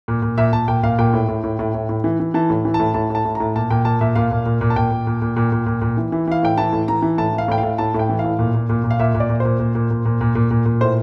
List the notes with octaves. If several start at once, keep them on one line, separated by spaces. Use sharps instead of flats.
A#2
A#2
A#2 E5
A#2 A5
A#2 G5
A#2 F5
A#2 G5
A2
A2
A2
A2
A2
A2
E3
E3
E3 A5
A2
E3
A5
A2
A2 A5
A2 A5
A2
A2 A#5
A#2 A5
A#2 G5
A#2 A5
A#2 E5
A#2 F5
A#2
A#2
A#2
A5
A#2 G5
A#2
A#2
A#2
A#2
A#2
A#2
A#2
E3
E3
E3 F5
A2 G5
E3 A5
A2
E3 A#5
E3
A2 A5
E3
F5
A2 G5
F5
A2
A2 A5
A2
G5
E3
F5
A2
A#2
A#2
A#2
A#2
F5
A#2 E5
A#2
D5
A#2
A#2 C5
A#2
A#2
A#2
A#2
A#2
A#2
A#2
A#2
A2 C5